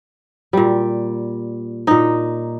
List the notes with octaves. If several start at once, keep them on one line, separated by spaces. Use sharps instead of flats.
A#2 G3
A#2 D#4